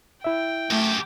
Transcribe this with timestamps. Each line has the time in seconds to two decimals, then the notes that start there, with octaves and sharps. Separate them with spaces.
0.24 E4 E5 G5
0.70 F#2 A3 G4